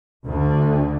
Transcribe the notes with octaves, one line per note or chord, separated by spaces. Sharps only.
D2 D3